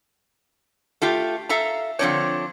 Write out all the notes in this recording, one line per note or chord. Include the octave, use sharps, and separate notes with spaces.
A3 F4 G4
A4 E5 F5 A#5
D3 F3 G3 C4 D4 C#5